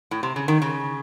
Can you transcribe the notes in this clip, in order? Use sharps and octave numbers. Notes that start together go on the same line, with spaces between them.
A2
C3
C#3
D#3
C#3